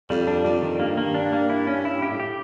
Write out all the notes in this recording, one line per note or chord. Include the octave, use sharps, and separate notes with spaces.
F2 G3
D4
F2 G3
D#3
G2 A#3
A#3
D4
A#3
E4
C#4
E4
G4
A2
G4